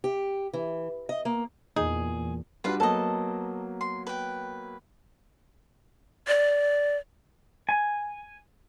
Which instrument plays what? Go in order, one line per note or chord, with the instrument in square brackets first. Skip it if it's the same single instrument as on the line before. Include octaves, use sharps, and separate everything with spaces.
[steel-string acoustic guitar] G4
E3
D#5
A#3
[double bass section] E2 [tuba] A#2 [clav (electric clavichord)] D#4 [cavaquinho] G#4
[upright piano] G3 D4 F#4 [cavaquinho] F4 B4 F5
[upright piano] F#3 A#3 B3 [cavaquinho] A4 D#5
[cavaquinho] C6
B4 G5
[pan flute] D5
[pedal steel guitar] G#5